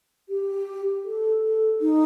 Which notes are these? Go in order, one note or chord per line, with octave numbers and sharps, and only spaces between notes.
G4
A4
A4
D#4